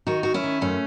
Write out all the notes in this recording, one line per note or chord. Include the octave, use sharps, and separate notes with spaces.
D#3 D#4 F#4
D#3 F#4
C#4 E4
D#3
F#2 A3 C#4